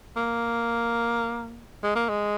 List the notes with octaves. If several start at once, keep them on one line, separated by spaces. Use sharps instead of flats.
A#3
G#3
A#3
G#3